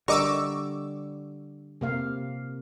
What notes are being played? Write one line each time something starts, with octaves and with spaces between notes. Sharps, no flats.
D3 G3 A#4 D#5 C#6 D6 E6
C3 A#3 F5